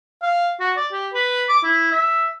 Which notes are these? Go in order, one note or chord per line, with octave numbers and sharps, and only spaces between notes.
F5
F#4
D5
G4
B4
D6
E4
E5